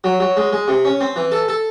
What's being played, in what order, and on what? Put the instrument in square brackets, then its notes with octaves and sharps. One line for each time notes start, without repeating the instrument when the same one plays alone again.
[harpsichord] F#3
F#3
G#3
G#3
C3
C#4
C4
E3
A4
A4